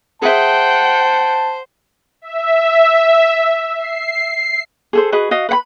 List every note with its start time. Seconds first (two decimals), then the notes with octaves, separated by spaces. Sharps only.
0.22 G#4 C5 E5 F#5 G5 A5
2.22 E5
3.77 C7
4.28 C7
4.93 G#4 A4 C5
5.12 F#4 G#4 B4 D#5
5.31 F#4 D#5 F5
5.49 B4 F#5 B5